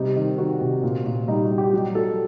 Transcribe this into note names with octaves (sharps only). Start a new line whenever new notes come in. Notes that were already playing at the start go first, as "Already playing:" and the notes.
Already playing: C3 G3 D#4
D#3
D#3 F#4
C3
A#2
A#2
G3 D#4
F#4
G3
G4
F#3 F#4
F#3 A4